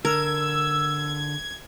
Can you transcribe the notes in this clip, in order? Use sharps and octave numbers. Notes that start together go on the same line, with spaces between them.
D3 A#4 E6 G#6